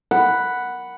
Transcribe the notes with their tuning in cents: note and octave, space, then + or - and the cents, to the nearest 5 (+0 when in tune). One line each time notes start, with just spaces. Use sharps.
F#5 +0 B5 +0